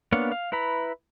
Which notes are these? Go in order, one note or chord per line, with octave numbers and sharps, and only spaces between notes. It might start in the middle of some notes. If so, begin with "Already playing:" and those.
A#3 B3 D4 C#5 F5
F5
E4 B4 A#5 B5